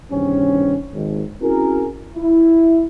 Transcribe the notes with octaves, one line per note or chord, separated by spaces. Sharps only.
E2 G2 C3 D#3 C4 C#4
G#1 D#2
C4 C#4 E4 F#4 G#4 A#4
E4